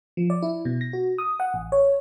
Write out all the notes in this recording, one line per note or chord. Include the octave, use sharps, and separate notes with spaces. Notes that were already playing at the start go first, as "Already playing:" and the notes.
F3
D5
E4
B2
A#6
F#4
D#6
F#5
A1
C#5